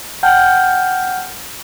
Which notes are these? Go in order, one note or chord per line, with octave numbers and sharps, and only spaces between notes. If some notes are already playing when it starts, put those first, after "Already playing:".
F#5 G5 A5 F6 G6